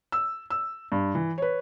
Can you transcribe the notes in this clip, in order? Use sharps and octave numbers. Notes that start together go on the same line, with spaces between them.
E6
E6
G2
E3
B4 C#5